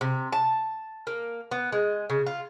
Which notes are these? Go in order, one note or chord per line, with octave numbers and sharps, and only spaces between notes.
C3
A5
A#3
B3
G#3
C#3
F4